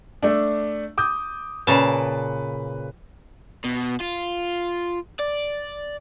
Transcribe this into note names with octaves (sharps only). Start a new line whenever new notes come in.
A3 D4
D6 D#6 G6
A#2 C#3 B4 A5
B2
F4
D5